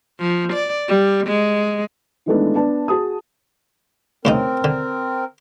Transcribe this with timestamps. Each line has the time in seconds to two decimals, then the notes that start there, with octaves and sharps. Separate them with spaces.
0.20 F3
0.53 D5
0.89 G3
1.27 G#3
2.26 D#3 E3 G#3 A3 B3 D4
2.55 B3 D4 D5 A5
2.88 F#4 G#4 A5 D#6
4.25 A2 C#3 C4 D#4 A#4
4.64 D3